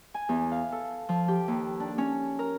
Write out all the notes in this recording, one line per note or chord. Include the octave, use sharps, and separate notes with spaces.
G#5
E2
F5
A4
F3
G4
D#2
D4
C#4
A#4